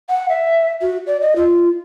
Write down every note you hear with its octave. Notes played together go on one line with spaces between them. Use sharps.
F#5
E5
F#4
D5
D#5
F4